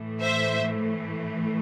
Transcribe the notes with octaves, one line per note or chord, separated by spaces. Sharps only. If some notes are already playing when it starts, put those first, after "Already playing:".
Already playing: A2 E3 A3
C5 E5